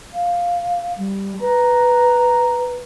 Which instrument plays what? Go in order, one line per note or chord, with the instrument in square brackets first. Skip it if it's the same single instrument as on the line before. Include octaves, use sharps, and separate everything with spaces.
[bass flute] F5
G3
[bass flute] B4 [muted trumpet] A#5